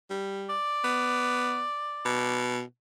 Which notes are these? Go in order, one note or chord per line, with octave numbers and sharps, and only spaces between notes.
G3
D5
B3
B2